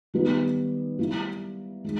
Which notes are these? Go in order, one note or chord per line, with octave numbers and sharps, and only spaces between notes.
D#3 G3 B3 D#4
G3 A#3 E4
D#3 G#3 D#4